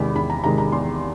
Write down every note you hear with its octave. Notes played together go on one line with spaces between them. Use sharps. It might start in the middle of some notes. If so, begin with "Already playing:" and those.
Already playing: E2 C3 D#3 G#3 B5
E2 B5
A#5
C3 D#3 G#3 A#5
A#5
E2 C6